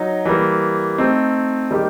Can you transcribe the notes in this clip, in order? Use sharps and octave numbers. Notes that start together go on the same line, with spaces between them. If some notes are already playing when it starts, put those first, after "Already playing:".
Already playing: F#3 D#4
E3 G3 A#3
A3 C4 D#4
D#3 G3 A#3 D#4 G4